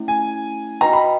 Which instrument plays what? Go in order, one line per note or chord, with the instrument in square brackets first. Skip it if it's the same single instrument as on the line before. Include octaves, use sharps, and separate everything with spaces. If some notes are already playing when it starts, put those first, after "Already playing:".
Already playing: [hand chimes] A3 C#4 E4
[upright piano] G#5
[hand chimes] D#4 F#4 B4 D#5 G5 [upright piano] A#5
[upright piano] B5